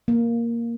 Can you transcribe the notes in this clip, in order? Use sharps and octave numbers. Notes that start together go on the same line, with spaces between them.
A#3